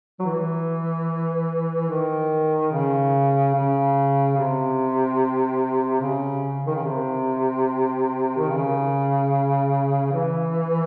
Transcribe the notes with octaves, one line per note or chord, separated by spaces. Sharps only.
F#3
E3
D#3
C#3
C#3
C3
C#3
D#3
C#3
C3
D#3
C#3
E3